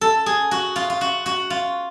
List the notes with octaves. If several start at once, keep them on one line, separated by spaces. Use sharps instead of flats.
A4
G#4
F#4
F4
F4
F#4
F#4
F4